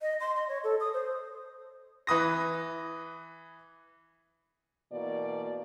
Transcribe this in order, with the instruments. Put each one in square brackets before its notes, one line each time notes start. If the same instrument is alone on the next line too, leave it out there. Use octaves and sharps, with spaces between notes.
[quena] D#5
C6
D#5
C#5
A4
D#6
C5
[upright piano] E3 B4 D#6 A#6
[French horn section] B2 E3 A#3 D5